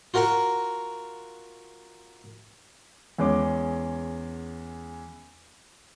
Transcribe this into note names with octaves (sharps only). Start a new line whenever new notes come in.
F4 F#4 A#4 F#5 A#5
E2 G#3 C#4 D6